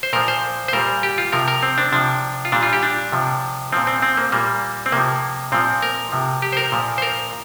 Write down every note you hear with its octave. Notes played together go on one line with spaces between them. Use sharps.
C5
A#2 F3 A#4
C5
C5
A#2 G3 A#4
G4
F4
C3 F3 A#4
A#4
C4
D4
C3 F3 D4
F4
A#2 G3 D4
F4
G4
D4
C3 F3
A#2 F3 C4
C4
C4
A#3
A#2 G3 A#3
C4
C3 F3 A#3
A#2 F3 C4
A#4
C3 F3
G4
C5
A#4
A#2 F3
C5
A#4